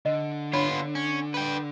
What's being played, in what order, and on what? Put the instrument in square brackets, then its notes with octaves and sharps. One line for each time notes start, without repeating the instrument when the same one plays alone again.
[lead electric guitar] D3 [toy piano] D#5
[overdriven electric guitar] B3 F4 [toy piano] D4 C#5 B5
[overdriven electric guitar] C#4
B4 G5